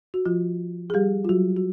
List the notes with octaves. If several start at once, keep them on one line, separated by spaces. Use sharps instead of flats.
F#4
F3 F4
G#4
G3 G4
F4
F#3 F#4
F#4